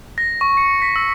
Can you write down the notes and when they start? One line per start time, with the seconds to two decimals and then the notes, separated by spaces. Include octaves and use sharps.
0.18 A#6
0.41 C#6
0.57 C#7
0.82 B6
0.96 E6